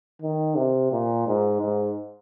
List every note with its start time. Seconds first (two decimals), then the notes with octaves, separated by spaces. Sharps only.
0.22 D#3
0.57 C3
0.92 A#2
1.27 G#2
1.62 G#2